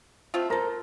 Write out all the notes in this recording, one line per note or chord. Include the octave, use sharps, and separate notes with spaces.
A3 C4 F4
A4 A#4 C5 A#5 A#6